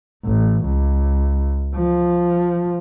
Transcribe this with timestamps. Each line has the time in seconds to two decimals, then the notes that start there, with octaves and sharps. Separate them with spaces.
0.24 A1
0.64 C#2
1.75 F3